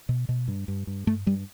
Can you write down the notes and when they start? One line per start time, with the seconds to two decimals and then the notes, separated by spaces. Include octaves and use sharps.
0.09 B2
0.29 B2
0.48 G2
0.68 G2
0.87 G2
1.07 G2 A3
1.26 G2 G3